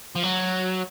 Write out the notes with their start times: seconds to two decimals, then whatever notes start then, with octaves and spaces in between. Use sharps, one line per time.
0.16 F3
0.23 F#3